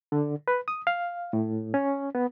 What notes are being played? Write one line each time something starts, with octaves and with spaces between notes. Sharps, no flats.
D3
B4
D#6
F5
A2
C#4
B3